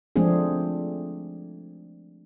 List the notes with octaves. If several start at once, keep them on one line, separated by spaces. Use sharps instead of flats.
F3 G#3 A3 C4 D4 G#4